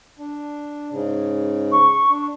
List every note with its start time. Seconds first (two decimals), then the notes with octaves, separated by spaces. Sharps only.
0.18 D4
0.91 G#2 C#3
1.72 C#6
2.10 D4